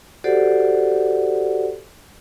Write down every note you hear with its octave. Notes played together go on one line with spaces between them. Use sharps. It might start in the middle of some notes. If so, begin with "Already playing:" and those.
F#4 G4 A4 C5 D5 F#5